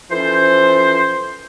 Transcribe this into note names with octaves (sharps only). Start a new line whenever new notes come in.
E3 F3 C#4 A4 C5